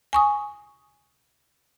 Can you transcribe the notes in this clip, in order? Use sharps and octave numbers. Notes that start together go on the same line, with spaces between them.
G#5 C#6 D#6